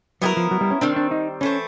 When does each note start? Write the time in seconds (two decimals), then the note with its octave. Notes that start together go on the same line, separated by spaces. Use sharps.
0.22 F#3 B3 E4 G4 A#4
0.37 F3
0.51 F#3
0.61 G3
0.71 C#4
0.81 D#3 G3 C4 D4
0.96 D4
1.11 D#4
1.41 E3 A3 C4 C#4